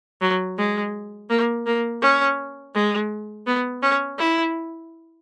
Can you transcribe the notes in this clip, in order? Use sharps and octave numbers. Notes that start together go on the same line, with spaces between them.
F#3
G#3
A#3
A#3
C#4
G#3
B3
C#4
E4